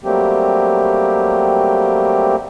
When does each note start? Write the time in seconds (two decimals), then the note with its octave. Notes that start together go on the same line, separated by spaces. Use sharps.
0.04 F#3 G3 A3 A#3 C4 G4